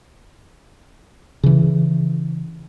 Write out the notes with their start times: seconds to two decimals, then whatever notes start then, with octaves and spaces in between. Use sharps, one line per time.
1.43 C#3 E3